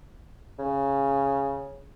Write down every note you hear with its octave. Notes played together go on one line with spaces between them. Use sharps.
C#3